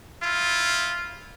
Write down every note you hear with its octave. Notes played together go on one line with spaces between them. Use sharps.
E4 F4